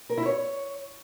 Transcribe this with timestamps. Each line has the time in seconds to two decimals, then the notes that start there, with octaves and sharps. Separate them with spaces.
0.09 A#4
0.18 E4
0.26 C#5